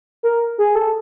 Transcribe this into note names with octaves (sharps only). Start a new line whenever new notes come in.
A#4
G#4
A4